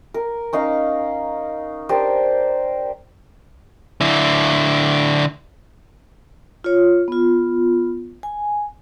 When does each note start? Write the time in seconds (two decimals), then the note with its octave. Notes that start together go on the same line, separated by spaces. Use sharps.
0.14 A#4
0.53 C#4 D#4 F5 A#5
1.89 D4 G4 A#4 C5
4.01 D3 E4
6.64 F4 C#5
7.08 B3 F4
8.23 G#5